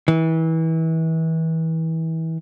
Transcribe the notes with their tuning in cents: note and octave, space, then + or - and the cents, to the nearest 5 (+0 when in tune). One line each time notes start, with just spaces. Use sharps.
E3 -30